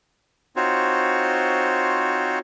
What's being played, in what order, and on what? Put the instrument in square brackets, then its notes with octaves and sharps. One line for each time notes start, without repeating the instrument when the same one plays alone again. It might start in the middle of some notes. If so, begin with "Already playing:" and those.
[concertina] C4 D#4 F4 F#4 C5 C#5